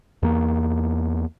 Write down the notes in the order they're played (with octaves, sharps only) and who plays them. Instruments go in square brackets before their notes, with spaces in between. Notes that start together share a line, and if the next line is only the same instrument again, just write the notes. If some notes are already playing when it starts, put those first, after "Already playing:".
[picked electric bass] E2 A#3